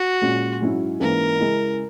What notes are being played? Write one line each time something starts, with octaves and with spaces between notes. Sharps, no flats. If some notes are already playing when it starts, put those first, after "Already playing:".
Already playing: F#4
A#2 G#3 C#4
G#2 F#3 C#4 E4
G#2 E3 A#3 C#4 E4 A#4
C#3 G#3 C#4 E4